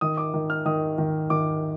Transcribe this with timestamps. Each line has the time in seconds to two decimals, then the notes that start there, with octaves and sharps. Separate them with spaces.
0.01 D#3 D#6
0.17 D6
0.34 D#3
0.50 F6
0.65 D#3 D#6
0.98 D#3
1.30 D#3 D6